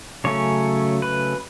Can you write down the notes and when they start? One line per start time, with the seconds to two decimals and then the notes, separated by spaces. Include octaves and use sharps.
0.24 C#3 F#3 A3 C#4 C#5
1.02 B4